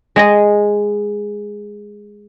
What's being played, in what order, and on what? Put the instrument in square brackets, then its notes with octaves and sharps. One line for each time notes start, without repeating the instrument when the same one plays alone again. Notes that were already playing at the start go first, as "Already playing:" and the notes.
[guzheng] G#3 G#4 D#5